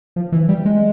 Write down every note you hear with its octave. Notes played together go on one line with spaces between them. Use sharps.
F3
E3
G3
G#3